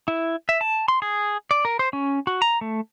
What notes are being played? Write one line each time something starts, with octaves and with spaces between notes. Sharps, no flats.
E4
E5
A5
C6
G#4
D5
A#4
C5
C#4
F#4
A#5
A3